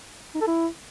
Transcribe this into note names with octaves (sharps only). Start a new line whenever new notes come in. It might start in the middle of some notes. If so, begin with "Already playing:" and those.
D#4
A4
E4